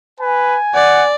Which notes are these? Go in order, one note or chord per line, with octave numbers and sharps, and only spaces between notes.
B4 G#5
D5 F#5